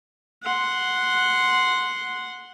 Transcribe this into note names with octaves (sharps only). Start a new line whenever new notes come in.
F#5 C6